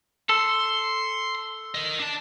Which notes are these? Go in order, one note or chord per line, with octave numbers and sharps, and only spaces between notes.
A4 C6
A#4 D#5
D4 A5